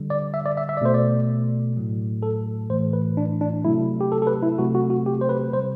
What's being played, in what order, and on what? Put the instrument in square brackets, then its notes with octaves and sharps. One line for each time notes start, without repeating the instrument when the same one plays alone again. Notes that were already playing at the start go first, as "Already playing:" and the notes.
Already playing: [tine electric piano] D3 G3
D5
E5
D5
E5
E5
D5
B2 A3 C5
D5
A2 F#3 A3
A4
A2 E3 A3 C5
B4
D4
D4
C3 F#3 A3 E4
G4
A4
A4
B4
E4
C3 F#3 A3 F#4
F#4
F#4
G4
C5
B4
C3 C5
G3